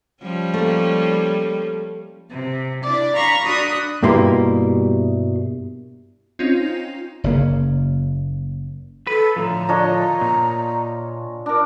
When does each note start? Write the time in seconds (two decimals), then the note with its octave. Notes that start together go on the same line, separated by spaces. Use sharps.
0.22 F3 G3 C#4
0.54 A3 A#3
2.31 C3
2.82 D4 E4 D5
3.15 F5 A#5 B5 C#6
3.44 D4 F#4 B5 D#6 F#6
4.03 G2 B2 G3 A#3 E4 C6
6.39 C4 C#4 D#4 F4
7.24 F#1 C#3 A#3
9.07 A4 B4
9.36 A2 D3 F3 A#5
9.69 D4 F4 C#5 D#5
10.21 A#2
11.46 D4 A#4